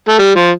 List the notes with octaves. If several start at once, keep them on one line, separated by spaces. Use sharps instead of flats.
A3
G3
F3